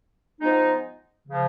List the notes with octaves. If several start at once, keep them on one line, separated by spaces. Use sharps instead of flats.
F3 G#3 B3 D#4
C#3 F3